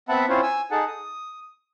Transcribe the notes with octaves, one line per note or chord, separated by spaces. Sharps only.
B3 C4 E5 F#5 A5 B5
C4 C#4 E4 F4 C5 C#5
G#5 E6
D#4 G#4 A4 F#5 A5
D#6